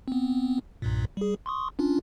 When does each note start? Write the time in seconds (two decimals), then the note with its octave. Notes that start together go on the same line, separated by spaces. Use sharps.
0.08 B3 C4
0.82 B1 G2 A#2
1.17 G3 G#4
1.46 C6 C#6 D#6
1.79 C#4 D4 F4